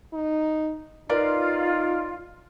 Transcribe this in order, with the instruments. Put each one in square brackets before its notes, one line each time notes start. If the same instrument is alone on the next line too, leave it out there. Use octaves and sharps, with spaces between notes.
[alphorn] D#4
[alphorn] D#4 [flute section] F4 [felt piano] A#4 B4 D5